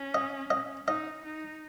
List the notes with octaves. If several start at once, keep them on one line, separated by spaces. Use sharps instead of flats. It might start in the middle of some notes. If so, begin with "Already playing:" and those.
Already playing: C#4
D#5
D#5
D#4 D#5
D#4